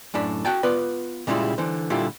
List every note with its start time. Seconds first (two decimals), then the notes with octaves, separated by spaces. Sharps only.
0.14 F#2 A2 D4 B5
0.45 F#4 F#5 G5 A5
0.63 B3 F4 B4 D5
1.27 A#2 C#3 G3 G#3 E4 F4
1.58 D3 E3 C5
1.90 A#2 D3 G3 E4 F4 G4